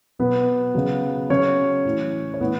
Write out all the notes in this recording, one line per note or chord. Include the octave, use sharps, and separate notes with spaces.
B2 F#3 B3 B4
C#3 F#3
C#3 F#3 C#4 C#5
A2 E3
C#5
A2 E3 B3 B4